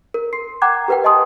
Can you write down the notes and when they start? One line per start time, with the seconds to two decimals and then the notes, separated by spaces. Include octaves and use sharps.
0.14 A#4
0.33 C6 C7
0.62 F#5 G5 A#5 D6 F#6 G#6
0.88 G4 A#4 B4 F#5 G5
1.04 D#5 G#5 A5 C6 D#6